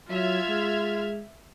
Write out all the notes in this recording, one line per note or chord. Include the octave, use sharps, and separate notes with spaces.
F#3 F4 E5 F6 G#6
G#3